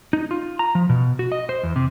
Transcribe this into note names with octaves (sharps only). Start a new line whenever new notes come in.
D#4
F4
A#5
F3
B2
F#4
D#5
C5
E2
C3